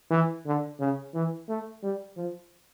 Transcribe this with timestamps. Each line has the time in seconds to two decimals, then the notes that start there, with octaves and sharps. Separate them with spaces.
0.11 E3
0.46 D3
0.80 C#3
1.14 E3
1.49 A3
1.83 G3
2.17 F3